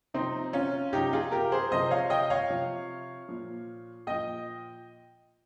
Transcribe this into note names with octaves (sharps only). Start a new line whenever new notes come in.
C3 F3 C4 D#4
C#4 F4
C3 F3 D#4 G4
F4 G#4
G4 A#4
G#4 C5
C3 F3 C5 D#5
C#5 F5
D#5 G5
C#5 F5
C3 F3
A#2 F3
A#2 F3 D#5 G5